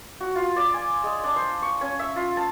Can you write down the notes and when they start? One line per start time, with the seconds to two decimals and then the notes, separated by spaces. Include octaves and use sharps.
0.20 F#4
0.35 F4
0.56 D5
0.74 G#5
1.04 G#3
1.24 D4
1.36 C5
1.62 C#6
1.81 C#4
1.99 E5
2.16 F4
2.37 A5